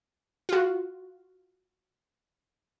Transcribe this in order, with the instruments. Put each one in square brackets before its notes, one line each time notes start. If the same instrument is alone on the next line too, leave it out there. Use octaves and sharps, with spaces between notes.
[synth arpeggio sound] F4 F#4